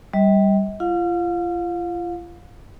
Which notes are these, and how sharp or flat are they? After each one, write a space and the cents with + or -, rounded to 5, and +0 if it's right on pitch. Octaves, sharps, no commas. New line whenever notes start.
G3 +0 D#5 +45
F4 -35 F5 +30